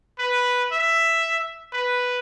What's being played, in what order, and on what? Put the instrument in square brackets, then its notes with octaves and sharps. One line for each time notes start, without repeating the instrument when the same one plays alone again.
[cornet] B4
E5
B4